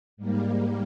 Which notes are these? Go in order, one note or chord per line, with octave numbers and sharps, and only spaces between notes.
G#2 G3 A#3